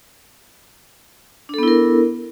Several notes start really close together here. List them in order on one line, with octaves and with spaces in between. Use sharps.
D4 A4 B3 E4 A#4